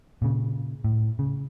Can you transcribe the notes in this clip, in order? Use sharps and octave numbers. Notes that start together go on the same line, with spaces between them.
A#2 C#3
A2
C#3